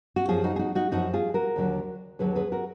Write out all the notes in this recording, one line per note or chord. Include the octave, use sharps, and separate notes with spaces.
F#4
F#2 F3 F4 G#4
D#4 F#4
G#4
D#4 F#4
D#4 F#4
F#2 F3 D#4 F#4
F4 G#4
F#4 A#4
D#2 D3 F#3
D#2 D3 F#3 G#4 B4
G#4 B4
F#4 A#4